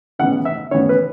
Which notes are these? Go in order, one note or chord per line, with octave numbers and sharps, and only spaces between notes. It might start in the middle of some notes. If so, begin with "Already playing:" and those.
C#3 E3 B3 F#5
E5
C#3 E3 B3 C#5
B4